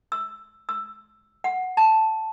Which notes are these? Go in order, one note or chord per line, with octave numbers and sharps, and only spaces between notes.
E6
E6
F#5
A5